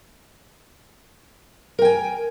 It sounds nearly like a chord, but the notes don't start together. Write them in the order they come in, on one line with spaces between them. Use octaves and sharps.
A#4 G5 G#5